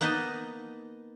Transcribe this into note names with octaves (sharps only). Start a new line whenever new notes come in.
A#3 B3 D#4 B4 D#5 A5